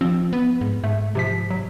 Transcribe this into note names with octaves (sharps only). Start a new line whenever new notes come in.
F3 C4
B3
G#2
G#2 A3
C3 F3 B6
F#3